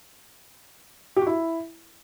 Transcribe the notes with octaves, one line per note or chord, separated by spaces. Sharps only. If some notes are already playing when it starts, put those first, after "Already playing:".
G4
F#4
E4